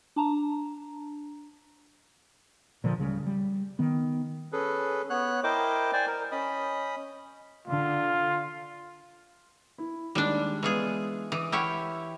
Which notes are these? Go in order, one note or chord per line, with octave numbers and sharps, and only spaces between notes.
D4 A5 A#5
A#2 D3 F3
D1 C#3 G3
G3
D#3 B3
C#4 G#4 A4 B4
B3 C#5 F#6
E4 A#4 C5 D#5 G5 D6
C5 D5 G5 G#5
A#4
C#4 D#5 B5 D#6
D3 F4
E4
D#2 G3 G#3 D4 E7
E3 G#3 B3 F4 G#4
E3 D6 D#6
E4 G4 C#5 F#5 G5 F6